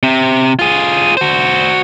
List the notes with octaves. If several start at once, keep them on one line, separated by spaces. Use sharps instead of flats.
C3
F4 G#4
F#4 C5